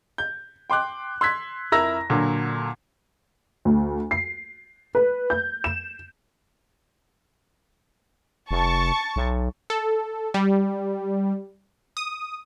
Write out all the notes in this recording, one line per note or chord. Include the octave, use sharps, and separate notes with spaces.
G6
G5 C6 D6 F#6
C6 E6 F#6 G#6 B6
F2 E4 A#4 A#5 E6 A#6
A#2 D3 F#3
D2
C7
B4
G6
E7
F1 A5 C#6
B1
A4
G3
D#6